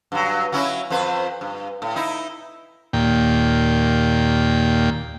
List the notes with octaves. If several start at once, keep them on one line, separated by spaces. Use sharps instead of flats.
G2 F#3
F#3 C#4 E4
F2 B4 C5
G2
A2
D#4 E4
D#2 A#2 G5